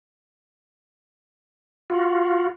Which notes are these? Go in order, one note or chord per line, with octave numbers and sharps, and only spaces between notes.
F4 F#4